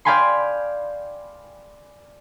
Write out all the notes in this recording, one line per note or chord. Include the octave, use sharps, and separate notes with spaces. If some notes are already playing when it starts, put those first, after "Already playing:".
D5 F5 G5 G#5 B5 C6